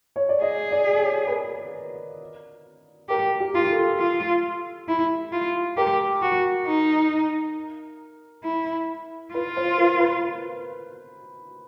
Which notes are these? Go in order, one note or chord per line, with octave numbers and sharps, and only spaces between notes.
C#5
D5
G#4 D#5
D5
C#5
B4
A#4
G4 A#4
G4
F4
A4
F4
E4
F4
G4 A#4
F#4
D#4
E4
F4 B4
C5
A#4
B4